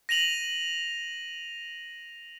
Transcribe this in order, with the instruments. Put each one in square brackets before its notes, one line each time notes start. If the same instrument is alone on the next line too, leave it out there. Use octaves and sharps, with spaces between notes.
[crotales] A#6 D#7 F7 F#7